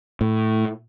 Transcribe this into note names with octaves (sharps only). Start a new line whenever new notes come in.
A2